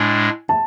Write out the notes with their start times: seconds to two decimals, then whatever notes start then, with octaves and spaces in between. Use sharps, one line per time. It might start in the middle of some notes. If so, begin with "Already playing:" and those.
Already playing: A2 G#3 D4 G#5
0.49 A5